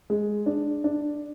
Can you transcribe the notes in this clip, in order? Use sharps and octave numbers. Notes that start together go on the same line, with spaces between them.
G#3
D4
D4